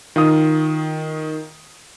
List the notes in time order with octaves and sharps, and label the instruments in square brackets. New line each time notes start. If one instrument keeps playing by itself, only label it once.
[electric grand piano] D#3 F4 D#6